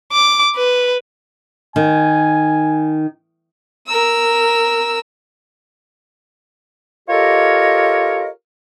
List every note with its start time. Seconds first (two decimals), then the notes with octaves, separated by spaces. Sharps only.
0.13 D6
0.56 B4
1.76 D#3 G#5
3.87 A#4 E6
7.08 F4 G4 A4 A#4 C#5 D#5